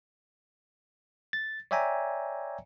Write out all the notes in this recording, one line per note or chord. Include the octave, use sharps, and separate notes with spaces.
A6
C#5 D5 E5 G5 G#5 A#5